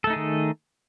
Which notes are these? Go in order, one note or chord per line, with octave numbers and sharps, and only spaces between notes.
D#3 A3 D#4 G#4 A4